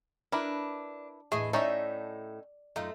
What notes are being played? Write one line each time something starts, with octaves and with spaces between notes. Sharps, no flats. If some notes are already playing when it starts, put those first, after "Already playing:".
D4 E4 A#4 B4
E2 A2 A3 G#4 D#5
A2 C#4 D#4 A4 D5 E5
F#2 A3 D#4 F4